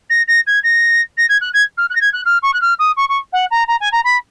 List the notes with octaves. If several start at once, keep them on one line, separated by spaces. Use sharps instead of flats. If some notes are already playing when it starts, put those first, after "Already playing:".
A#6
A#6
G#6
A#6
A#6
G#6
F#6
G#6
F6
F#6
A#6
G#6
F#6
F6
C#6
F#6
F6
D#6
C#6
C#6
F#5
A#5
A#5
G#5
A#5
B5